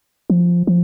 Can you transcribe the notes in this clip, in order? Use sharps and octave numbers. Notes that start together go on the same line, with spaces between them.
F3
F3